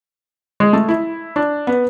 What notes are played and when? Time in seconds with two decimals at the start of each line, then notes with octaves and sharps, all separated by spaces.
0.60 G#3
0.73 A3
0.89 E4
1.36 D4
1.67 B3